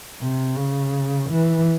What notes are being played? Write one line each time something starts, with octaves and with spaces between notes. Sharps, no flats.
C3
C#3
E3